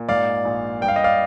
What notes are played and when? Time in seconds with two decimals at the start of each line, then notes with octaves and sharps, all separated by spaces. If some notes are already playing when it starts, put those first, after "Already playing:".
Already playing: A#2
0.09 G#2 D5 F5
0.45 A#1
0.81 G2 G5
0.88 F5
0.96 D#5
1.04 D5 F5